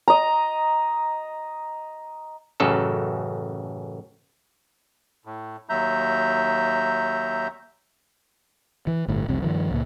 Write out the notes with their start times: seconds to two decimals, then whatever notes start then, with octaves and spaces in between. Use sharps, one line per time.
0.08 D#5 A#5
2.60 A1 F#2 C#3 A4
5.25 A2
5.69 D#2 F#3 E5 A#5 G6
8.87 E3
9.08 G1 A2
9.28 F#1 C2 F2 C3
9.42 G2 D#3 F3
9.70 C#2 A#2